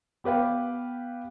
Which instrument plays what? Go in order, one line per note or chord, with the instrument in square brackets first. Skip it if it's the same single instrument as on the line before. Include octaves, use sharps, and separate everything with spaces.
[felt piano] B3 G4 B4 F5 G5